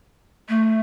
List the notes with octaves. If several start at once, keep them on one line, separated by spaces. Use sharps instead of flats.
A3